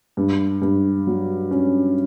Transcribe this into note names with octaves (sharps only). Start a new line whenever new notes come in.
G2
G2
F#3
C#4